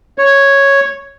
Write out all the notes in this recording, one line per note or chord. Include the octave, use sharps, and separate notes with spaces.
C#5